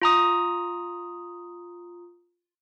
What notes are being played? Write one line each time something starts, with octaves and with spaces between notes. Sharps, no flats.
F4 A#5 D#6